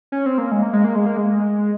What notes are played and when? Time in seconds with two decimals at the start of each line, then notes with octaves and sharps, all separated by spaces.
0.12 C#4
0.26 C4
0.38 A#3
0.51 G#3
0.62 A#3
0.73 G#3
0.84 A#3
0.96 G#3
1.06 A#3
1.17 G#3